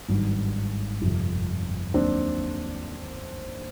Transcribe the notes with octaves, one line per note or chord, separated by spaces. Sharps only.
G#1 G2 D#3 F#3
G1 F2 C3 F3
D#2 D#3 F#3 C4 D4